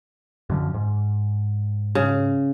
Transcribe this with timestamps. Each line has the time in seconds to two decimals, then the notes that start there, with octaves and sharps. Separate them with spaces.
0.50 F#2 D3 F3
0.74 G#2
1.95 C#3